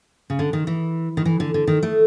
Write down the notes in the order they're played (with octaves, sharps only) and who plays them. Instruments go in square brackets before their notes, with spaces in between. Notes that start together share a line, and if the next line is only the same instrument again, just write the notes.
[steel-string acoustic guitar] C#3
D3
D#3
E3
D#3
E3
D3
D3
D#3
A3